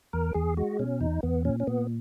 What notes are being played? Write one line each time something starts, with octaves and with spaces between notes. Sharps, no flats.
E2 A#4
E2 G#4
G#3 F#4
B2 C#4
E2 D#4
E2 B3
A#2 C#4
C#4
A#2 B3